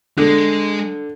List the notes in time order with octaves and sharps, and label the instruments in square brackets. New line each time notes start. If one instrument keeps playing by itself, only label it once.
[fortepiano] D3 [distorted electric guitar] G#3